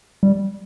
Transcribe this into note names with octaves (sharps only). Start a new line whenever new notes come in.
G3